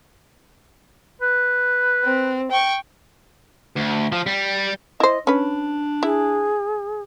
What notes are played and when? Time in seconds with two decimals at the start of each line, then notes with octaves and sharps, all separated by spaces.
1.21 B4
2.04 C4
2.51 G5 C#6
3.77 D2
4.12 F3
4.26 G3
5.00 E4 C5 D#5
5.27 C#4 D4 B4
6.03 E4 G#4